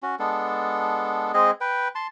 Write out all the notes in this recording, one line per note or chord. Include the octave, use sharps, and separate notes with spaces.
C#4 F#4
G#3 B3 D4 A4
G#3 C4 G#4 D#5
B4 G5
A5 C6